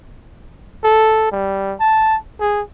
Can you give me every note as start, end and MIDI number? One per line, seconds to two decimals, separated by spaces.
0.84 1.27 69
1.32 1.75 55
1.80 2.17 81
2.41 2.62 68